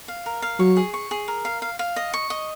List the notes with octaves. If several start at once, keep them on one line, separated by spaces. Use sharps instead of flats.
F5
A#4
F5
F#3 C#6
G#4
C#6
G#4
A#4
F5
F5
F5
D#5
C#6
D#5